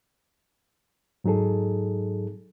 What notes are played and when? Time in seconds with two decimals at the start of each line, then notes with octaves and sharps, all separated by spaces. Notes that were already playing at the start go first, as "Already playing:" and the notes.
1.24 G#2 F#3 D#4 G#4 A4